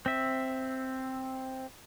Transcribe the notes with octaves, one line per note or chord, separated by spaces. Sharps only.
C4 E5